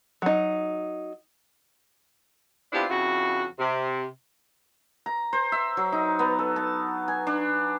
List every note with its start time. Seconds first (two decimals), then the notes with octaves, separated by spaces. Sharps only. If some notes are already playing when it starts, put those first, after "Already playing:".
0.22 F#3 D#4
2.73 B3 C4 D4 E4 F4 G4
2.89 F2 C#3 E4 F#4
3.59 C3
5.06 A#5
5.33 C5
5.52 E5
5.77 F#3
5.92 D#4
6.19 B3
6.39 A4
6.56 A5
7.08 G#5
7.27 D4